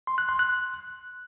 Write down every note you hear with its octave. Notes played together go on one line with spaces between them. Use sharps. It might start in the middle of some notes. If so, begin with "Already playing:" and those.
C6
F#6
C6
F#6